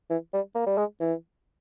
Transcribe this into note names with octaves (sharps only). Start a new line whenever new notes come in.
E3
G3
A#3
G3
G#3
E3